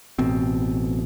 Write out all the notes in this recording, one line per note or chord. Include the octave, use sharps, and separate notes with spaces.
A1 B2 C4